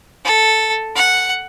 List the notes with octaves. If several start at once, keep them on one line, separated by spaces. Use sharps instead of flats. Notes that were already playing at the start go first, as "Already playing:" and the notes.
A4
F#5